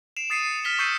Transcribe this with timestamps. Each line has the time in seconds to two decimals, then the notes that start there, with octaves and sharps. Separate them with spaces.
0.16 C7 D7 E7 F7
0.30 D#6 A6 C7 C#7 D#7
0.65 F6 A6 B6 G7
0.79 C#6 E6 G6 C7 C#7 D#7